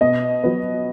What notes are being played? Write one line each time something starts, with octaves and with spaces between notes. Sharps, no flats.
B2 D#5
F#3 B3